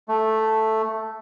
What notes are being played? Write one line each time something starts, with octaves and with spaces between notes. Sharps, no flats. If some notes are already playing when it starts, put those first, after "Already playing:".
A3